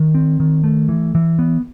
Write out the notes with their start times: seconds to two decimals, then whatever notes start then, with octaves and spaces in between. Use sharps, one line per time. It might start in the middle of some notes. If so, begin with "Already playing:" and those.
Already playing: D#3
0.14 C4
0.40 D#3
0.64 A3
0.89 E3
1.15 E3
1.39 B3